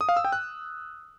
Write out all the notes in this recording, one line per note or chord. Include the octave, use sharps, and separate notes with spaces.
D#6
F5
E6
G5
F#6